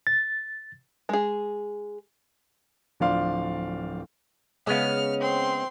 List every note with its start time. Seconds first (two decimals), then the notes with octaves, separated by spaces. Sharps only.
0.07 A6
1.09 G#3 G#4
3.00 D1 F3 D4 D5 F5 C6
4.67 C#3 G#3 B3 C#4 F5 F6
5.20 C4 C6